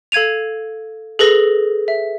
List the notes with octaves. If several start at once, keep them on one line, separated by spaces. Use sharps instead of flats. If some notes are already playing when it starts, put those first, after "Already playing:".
A4 F5 G#6 D#7 F7
G#4 A4 B4 A#6
E5